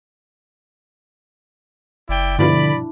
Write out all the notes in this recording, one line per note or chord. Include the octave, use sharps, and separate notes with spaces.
F#1 E4 D5 G5
G2 B2 D3 F3 D4 E4 D5 B5